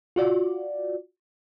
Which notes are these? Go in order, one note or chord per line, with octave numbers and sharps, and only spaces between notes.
F4 F#4 D5